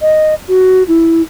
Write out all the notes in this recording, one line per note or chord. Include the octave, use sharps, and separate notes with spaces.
D#5
F#4
E4